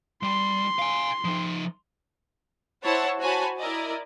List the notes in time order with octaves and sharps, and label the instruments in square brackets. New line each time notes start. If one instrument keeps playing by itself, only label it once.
[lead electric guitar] G3 [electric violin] C6
[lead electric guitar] F5 G#5
F3 D#4
[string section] E4 C5 C#5 F#5 A5
F#4 C5 C#5 G#5 A5 B5
E4 A#4 D5 D#5